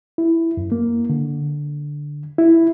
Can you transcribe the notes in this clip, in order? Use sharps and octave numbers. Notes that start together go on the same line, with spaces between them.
E4
F#2
A#3
D3
E4